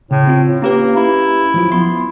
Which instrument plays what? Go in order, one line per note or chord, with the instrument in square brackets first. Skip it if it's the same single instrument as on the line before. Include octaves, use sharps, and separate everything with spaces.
[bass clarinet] A2 [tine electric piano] C#3
[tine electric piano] C4 F4
[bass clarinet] A#3 [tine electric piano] C#4 G4 B4
[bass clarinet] E4
[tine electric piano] F3 F#3 F4
[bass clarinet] B3 [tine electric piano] C6